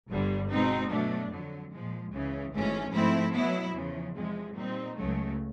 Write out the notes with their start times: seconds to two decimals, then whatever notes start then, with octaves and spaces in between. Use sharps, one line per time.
0.09 G1 G2 D3 G3
0.49 B2 G#3 C4 D#4
0.90 B2 F#3 A3 D4
1.30 F2 D3 F#3
1.71 A#2 F3 G#3
2.11 C#2 C#3 E3
2.53 G#1 G#2 E3 A3 C#4
2.93 G#2 F3 A3 C4 E4
3.34 B2 F#3 B3 E4
3.75 E2 C#3 F3
4.15 E2 C3 F3 G#3
4.55 A#2 G3 C4 D#4
4.96 C#2 C#3 F#3 A3